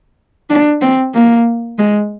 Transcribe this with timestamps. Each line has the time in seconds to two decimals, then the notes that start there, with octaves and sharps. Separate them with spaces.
0.50 D4
0.82 C4
1.15 A#3
1.78 G#3